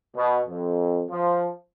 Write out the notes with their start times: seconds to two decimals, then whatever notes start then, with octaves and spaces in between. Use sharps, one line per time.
0.16 B2
0.48 F2
1.09 F3